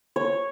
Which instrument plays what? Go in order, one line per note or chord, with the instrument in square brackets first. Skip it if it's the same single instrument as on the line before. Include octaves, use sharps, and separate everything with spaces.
[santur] C#5